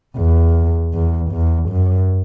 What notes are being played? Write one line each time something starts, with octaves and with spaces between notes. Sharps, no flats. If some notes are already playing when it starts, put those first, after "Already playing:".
E2
E2
E2
F#2